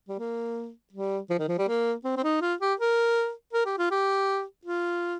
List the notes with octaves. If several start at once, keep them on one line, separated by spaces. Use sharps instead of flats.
G3
A#3
G3
F3
D#3
F3
G3
A#3
C4
C4
D#4
F4
G4
A#4
A#4
G4
F4
G4
F4